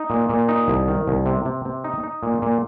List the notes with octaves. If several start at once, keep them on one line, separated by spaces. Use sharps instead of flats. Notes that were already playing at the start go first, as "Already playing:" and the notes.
Already playing: D#4
A#2
A#2
D#4
C2
D#3
C2
C3
C3
C3
D#4
D#4
A#2
A#2